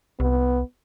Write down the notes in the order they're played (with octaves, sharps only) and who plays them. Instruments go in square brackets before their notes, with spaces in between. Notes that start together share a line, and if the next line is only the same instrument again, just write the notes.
[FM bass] C2 [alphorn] B3